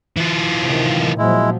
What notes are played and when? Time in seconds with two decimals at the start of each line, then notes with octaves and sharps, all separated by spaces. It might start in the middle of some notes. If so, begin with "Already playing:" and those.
0.17 E3 F4
0.62 C3 D#3
1.18 A#2 F3 F#3 G#3 E4